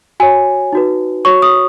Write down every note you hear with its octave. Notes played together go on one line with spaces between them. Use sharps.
F#4 C#5 G#5
D#4 F#4 B4
F#4 C#5 C#6
D#6